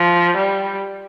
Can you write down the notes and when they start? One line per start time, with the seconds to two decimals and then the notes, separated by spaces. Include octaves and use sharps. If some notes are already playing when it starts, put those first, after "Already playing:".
Already playing: F3
0.37 G3